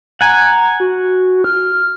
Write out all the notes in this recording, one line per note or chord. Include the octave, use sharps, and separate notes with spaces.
F#5 G#5 A#5
F#4
F6